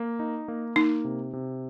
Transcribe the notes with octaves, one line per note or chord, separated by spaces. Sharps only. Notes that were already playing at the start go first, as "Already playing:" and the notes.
Already playing: A#3
D#4
A#3
A#3 D#4
C3
C3